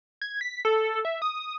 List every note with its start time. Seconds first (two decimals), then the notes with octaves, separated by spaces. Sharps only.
0.21 G#6
0.41 B6
0.65 A4
1.05 E5
1.22 D#6